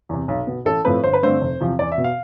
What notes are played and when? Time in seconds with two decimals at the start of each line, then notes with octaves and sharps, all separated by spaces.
0.09 E2 C3
0.28 B1
0.47 B2 B3
0.65 A1 A4
0.85 A2 F3 A3 C4 B4
1.03 G1 C5
1.13 B4
1.22 G2 D3 A3 C4 C5
1.41 F1
1.60 E2 C3 F3
1.79 E2 D5
1.92 E5
1.98 B2 B3
2.04 F5